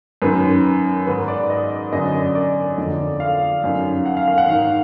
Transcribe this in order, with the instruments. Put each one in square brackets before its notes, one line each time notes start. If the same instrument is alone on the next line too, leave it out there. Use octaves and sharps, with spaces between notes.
[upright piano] F#2 D#3 B4
G#2 D#3 B4
D5
D#5
F#2 D3 D#5
D5
D5
F2 D3
F5
F#2 D#3
F#5
F5
F5
F#5
G#2 D#3 F5